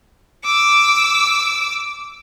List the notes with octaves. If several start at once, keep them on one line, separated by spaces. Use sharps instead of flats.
D6 E6